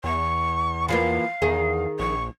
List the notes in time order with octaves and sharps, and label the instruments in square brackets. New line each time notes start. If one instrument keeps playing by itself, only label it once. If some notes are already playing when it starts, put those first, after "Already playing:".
[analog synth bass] E2 [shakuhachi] C#6
[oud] E3 F3 A#3 [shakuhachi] F5
[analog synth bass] E2 [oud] D#3 G#4
[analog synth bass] A#1 [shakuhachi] C#6